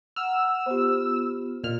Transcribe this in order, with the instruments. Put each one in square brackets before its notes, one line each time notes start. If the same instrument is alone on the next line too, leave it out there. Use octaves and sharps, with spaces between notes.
[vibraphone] F#5 A#5 [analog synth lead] E6 [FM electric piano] F6
[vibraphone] B3 F4 [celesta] G4 C5
[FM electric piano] A#2 F6 [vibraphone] D#5